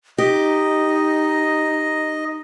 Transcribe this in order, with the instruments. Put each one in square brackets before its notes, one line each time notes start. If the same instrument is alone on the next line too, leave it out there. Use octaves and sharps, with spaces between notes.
[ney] D#4 [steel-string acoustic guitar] G4 [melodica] D#5